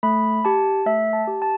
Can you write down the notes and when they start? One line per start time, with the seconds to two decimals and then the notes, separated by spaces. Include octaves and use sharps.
0.03 A3 B5
0.45 G4 A5
0.86 A3 E5
1.13 A5
1.28 G4
1.42 A5